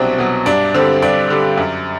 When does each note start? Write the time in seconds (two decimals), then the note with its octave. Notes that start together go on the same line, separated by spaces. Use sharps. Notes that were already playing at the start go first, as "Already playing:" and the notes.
Already playing: C2 B2 F#3 C4 D4 F#4
0.18 B2 F#3
0.46 G2 D4
0.74 D3 G3 C4
1.02 G2 D4
1.30 D3 G3
1.57 F#2